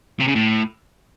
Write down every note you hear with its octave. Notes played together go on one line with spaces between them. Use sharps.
C3
C#3
A2